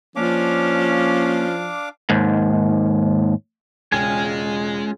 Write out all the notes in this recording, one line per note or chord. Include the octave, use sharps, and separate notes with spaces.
F3 A#3 C#4 D4 F5 D6
D#2 G#2
E1 C#3 G#3 C#4 F4 G5 G#5